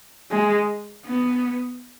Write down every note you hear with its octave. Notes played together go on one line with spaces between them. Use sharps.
G#3
B3